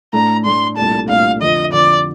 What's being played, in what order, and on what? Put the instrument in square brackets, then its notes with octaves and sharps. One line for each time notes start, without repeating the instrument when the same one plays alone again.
[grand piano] A2 A3 D4 [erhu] A#5
[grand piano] A2 A3 D4 [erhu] C6
[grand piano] C2 A#2 A3 D4 A4 [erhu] A5
[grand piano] C2 A#2 A3 D4 A4 [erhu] F5
[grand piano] F2 D3 F3 C4 [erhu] D#5
[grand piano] F2 D3 F3 C4 [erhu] D5